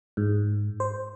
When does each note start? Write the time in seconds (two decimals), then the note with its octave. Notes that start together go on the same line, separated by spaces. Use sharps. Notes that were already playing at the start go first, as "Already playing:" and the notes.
0.17 G#2
0.80 C5